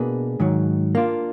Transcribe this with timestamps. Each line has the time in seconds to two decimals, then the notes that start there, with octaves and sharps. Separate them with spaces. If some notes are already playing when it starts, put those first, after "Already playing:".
Already playing: B2 A#3 D4 G#4 B4
0.40 G#2 D#3 F#3
0.95 A#3 D4 F4